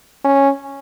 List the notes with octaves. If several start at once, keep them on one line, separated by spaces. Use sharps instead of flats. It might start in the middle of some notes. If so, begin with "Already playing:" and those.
C#4